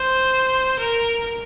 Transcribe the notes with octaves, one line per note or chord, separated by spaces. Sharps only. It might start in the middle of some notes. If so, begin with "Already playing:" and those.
Already playing: C5
A#4